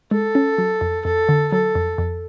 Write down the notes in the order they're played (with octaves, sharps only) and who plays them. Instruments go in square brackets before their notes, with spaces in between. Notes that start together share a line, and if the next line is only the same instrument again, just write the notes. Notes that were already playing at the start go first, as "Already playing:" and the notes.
[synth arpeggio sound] G#3 [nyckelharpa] A4
[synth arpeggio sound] C#4
F#3
F2
[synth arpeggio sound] F2 [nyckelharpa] A4
[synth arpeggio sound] D3
[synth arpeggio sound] F#3 [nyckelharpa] A4
[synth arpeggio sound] F2
F2